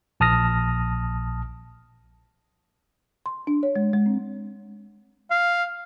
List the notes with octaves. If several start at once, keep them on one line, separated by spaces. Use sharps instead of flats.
A#1 A5 D#6 F6 A#6
C6
D4
C#5
G#3
G#3
C4
F5